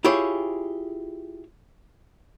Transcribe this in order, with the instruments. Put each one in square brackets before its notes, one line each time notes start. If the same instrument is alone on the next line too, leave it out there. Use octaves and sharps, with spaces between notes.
[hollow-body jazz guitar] E4 F4 G4 G#4 C#5